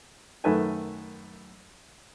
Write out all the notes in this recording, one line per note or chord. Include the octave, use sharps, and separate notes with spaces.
F#2 D#3 A3 B4 G#5